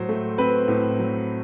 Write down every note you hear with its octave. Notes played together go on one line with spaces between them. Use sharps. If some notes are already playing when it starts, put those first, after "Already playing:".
Already playing: A2 F#3 C5
A3
C4 B4
A2
F#3